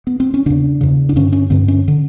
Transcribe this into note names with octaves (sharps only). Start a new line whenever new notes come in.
B3
C4
C#4
E2 C#3 D4
E2 C#3
D4
G2 D3 C#4
C#4
G2 D3 C4
C#4
D3